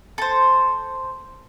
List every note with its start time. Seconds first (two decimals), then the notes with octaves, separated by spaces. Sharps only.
0.18 A4 C5